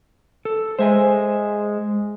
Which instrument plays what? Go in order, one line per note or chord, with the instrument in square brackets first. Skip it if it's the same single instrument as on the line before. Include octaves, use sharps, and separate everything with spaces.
[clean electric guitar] A4
[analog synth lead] G#3 [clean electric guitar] C5 E5 G#5